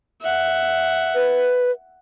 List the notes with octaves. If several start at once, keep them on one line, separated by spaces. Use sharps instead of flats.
E5 F#5
B4